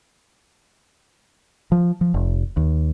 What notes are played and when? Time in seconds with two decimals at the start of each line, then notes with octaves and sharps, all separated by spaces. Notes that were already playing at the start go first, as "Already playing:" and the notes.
1.72 F3
2.01 F3
2.14 F1
2.57 D#2